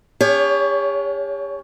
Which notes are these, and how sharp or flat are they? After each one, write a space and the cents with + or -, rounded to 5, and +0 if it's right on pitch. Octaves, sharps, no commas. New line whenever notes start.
C#4 +45 G4 +45 C#5 +20